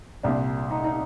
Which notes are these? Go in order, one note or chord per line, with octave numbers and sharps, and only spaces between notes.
C2 A#2 D4
D#4
D#4